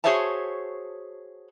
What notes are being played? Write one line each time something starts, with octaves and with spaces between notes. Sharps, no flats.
F#4 G#4 C5 C#5 E5 A5